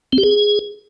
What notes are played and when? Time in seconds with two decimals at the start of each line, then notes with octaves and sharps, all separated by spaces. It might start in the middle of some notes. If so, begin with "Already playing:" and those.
0.13 C4
0.18 G4
0.23 G#4